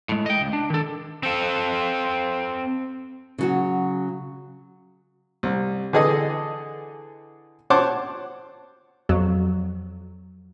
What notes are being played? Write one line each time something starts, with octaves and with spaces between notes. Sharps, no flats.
A2 G#3
D#5 G5
C#2
D4
D#3 A4
C4 A4
C#3 F#3 F#4
C2
D3 E3 G#4 A4 D#5 D#6
C5 C#5 F#5 A5 C6 D6
F2 F#3